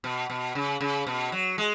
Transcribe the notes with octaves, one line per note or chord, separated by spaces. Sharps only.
B2
B2
C#3
C#3
B2
F#3
G#3